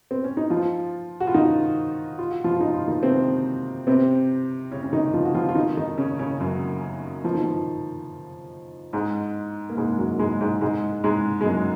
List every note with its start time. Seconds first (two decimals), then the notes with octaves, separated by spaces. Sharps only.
0.11 C4
0.24 C#4
0.37 D#4
0.50 F3 F4
1.20 F#4
1.27 F4
1.34 D#3 D#4
2.19 F4
2.31 F#4
2.44 F3 F4
2.61 D#4
2.74 F4
2.88 D#3 D#4
3.03 C3 C4
3.87 C3 C4
4.72 C#3 C#4
4.83 C#4
4.93 D#3 D#4
5.13 F3 F4
5.25 F#4
5.35 F3 F4
5.49 F4
5.55 D#3 D#4
5.77 D#3 D#4
5.98 C#3 C#4
6.19 C#3 C#4
6.40 F#2 F#3
7.24 F3
7.35 D#3
7.44 F3
8.93 G#2 G#3
9.70 A#3
9.77 G#2 G#3
9.98 F#2 F#3
10.19 G#2 G#3
10.41 G#2 G#3
10.61 G#2 G#3
11.04 G#2 G#3
11.41 G#3
11.46 F#2 F#3